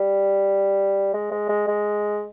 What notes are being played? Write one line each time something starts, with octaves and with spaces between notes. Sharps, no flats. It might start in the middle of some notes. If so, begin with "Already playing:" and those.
Already playing: G3
G#3
G#3
G#3
G#3